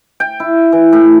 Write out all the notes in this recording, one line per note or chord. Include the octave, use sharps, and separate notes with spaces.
G5
E4
E3
A2